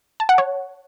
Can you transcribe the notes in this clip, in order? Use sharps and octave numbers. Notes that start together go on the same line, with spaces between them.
A5
F#5
C#5